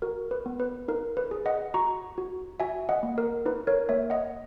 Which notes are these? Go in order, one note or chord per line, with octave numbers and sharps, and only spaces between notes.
F#4 A#4
B4
B3
B4
D#4 A#4
B4
G#4
D#5 F#5
F#4 A#5 C#6
F#4
F#4 E5 G#5
D#5 F#5
A#3
A#4
D#4 B4
A#4 C#5
A#3 C#5 E5
D#5 F#5